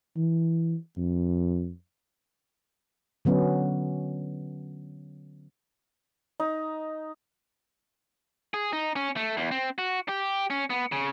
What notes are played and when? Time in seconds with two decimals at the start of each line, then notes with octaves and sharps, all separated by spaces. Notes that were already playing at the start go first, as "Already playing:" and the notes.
0.16 E3
0.97 F2
3.25 D3 F#3 B3 C#4
6.40 D#4
8.54 G#4
8.73 D#4
8.96 C#4
9.17 A3
9.37 E2
9.51 C4
9.78 F#4
10.09 G4
10.50 C#4
10.70 B3
10.92 C#3